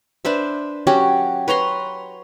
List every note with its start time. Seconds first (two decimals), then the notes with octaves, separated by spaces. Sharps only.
0.25 D4 B4 C5 E5
0.87 F#3 C#4 F#4 G4
1.48 B4 C#5 A#5 C6